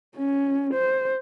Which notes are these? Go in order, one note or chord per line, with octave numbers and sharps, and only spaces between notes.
C#4
C5